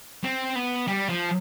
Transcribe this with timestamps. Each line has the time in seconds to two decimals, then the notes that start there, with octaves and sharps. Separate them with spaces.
0.24 C4
0.55 B3
0.88 G3
1.09 F3